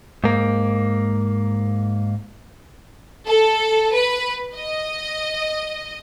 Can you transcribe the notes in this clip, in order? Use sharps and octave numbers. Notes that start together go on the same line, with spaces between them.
G#2 A#3
A4
B4
D#5